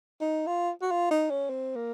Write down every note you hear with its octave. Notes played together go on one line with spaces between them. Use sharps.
D#4
F4
F#4
F4
D#4
C#4
C4
A#3